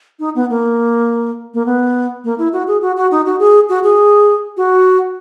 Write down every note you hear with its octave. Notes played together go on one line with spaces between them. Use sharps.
D#4
B3
A#3
A#3
B3
A#3
E4
F#4
G#4
F#4
F#4
D#4
F#4
G#4
F#4
G#4
F#4